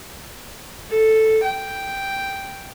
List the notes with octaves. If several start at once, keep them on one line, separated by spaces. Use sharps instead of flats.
A4
G5